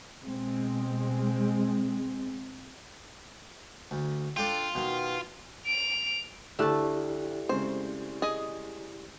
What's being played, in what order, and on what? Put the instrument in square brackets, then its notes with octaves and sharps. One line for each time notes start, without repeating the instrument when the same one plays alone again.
[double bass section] B2 G#3 C4
[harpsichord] D2
[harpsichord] D4 A4 G5 [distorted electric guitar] F4
[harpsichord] B2 D#3
[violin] D7 F7
[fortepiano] D2 D6 F#6 [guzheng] A3 A5 [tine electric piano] E4 G4 D5
[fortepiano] C#3 G#3 C4 [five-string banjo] C5
[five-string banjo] G#4 D#5